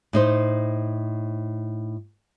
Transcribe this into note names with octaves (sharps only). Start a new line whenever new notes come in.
A2 D#4 C5